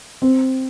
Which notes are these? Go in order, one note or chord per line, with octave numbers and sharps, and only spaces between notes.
C4